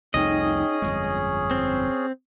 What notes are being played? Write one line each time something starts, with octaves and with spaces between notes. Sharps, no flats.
C2 F2 A3 C#4 D#4 G#4 D#5 G5
G1 F2 G#3 C#6 D#6
C4